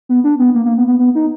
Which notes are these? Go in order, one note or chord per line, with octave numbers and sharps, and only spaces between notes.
B3
D4
B3
A#3
A#3
B3
B3
B3
D#4